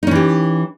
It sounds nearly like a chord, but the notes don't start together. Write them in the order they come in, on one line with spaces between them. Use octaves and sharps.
D#4 C#4 E3 G4